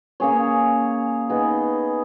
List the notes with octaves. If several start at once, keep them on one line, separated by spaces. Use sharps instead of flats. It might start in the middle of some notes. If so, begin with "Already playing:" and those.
A#3 C#4 G#4 C#5
B3 D#4 G#4 D#5